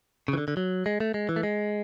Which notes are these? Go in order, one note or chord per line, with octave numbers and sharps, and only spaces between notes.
C#3
E3
D3
D3
F#3
G#3
A3
G#3
E3
A3
G#3